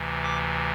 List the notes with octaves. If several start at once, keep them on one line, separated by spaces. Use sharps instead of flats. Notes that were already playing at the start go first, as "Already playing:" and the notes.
Already playing: D2 C3 E3
D6